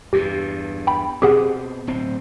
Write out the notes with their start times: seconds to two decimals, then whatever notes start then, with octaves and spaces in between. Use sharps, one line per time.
0.13 E2 G2 G4
0.87 G5 B5
1.22 B2 C4 G4 G#4 F#5
1.87 D1 C4